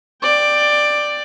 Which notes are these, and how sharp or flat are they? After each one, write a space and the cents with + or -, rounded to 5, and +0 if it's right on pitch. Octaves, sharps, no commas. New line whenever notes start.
D5 +10 G5 +0